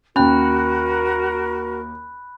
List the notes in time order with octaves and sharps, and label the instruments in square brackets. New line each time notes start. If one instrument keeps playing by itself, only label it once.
[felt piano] D#2 G5 [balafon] C#4 [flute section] F#4 A#4 [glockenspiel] B5 F#6